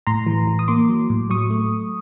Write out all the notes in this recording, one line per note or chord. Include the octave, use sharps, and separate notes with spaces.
A2 A#5 C6
E3
E3
D#6
A#3 C6 D6
F#3
A2
F#3 C#6 D#6
A3